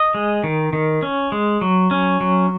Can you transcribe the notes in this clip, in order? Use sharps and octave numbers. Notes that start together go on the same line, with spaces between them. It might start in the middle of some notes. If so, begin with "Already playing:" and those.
Already playing: D#5
G#3
D#3
D#3
C#4
G#3
F#3
C#4
F#3